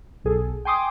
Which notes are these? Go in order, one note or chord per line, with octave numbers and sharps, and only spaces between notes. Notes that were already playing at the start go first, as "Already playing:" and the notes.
B1 G#4 A4
G5 G#5 C6 D6 D#6